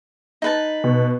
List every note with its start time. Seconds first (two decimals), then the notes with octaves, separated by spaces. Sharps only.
0.42 D#4 B4 A5
0.84 B2